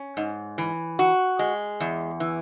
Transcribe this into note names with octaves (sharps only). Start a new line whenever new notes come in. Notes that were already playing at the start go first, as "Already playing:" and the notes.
Already playing: C#4
G#2
E3
F#4
G#3
E2
E3